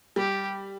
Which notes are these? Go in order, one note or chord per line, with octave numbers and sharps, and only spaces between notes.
G3 G4